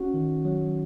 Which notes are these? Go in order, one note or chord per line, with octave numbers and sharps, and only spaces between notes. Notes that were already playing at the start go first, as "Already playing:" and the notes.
Already playing: C#4 F#4
D#3
F#3